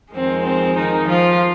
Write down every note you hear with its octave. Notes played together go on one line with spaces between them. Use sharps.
F2 D#3 G#3 C4
C4
D#3 D#4
F3 F4